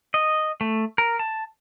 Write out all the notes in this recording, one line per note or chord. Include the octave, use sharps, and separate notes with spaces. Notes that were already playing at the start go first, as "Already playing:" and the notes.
D#5
A3
A#4
A5